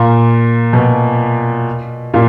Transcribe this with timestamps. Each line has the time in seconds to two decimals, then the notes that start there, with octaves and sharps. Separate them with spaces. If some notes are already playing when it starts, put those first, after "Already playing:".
Already playing: A#2
0.73 B2
2.14 A#2